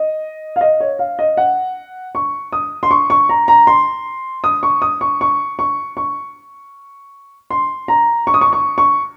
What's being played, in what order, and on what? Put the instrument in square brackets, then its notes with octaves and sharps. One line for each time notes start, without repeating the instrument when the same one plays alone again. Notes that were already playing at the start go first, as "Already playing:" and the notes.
Already playing: [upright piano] D#5
F5
D#5
C#5
F5
D#5
F#5
C#6
D#6
C6
C#6
C#6
A#5
A#5
C6
D#6
C#6
D#6
C#6
C#6
C#6
C#6
C6
A#5
C#6
D#6
C#6
C#6
C#6